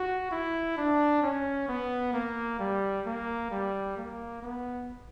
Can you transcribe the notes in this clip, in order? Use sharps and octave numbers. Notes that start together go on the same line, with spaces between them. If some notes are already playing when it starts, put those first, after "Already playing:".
Already playing: F#4
E4
D4
C#4
B3
A#3
G3
A#3
G3
A#3
B3